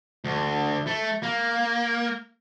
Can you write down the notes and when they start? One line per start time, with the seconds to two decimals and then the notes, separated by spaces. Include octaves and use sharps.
0.24 D2
0.87 A3
1.23 A#3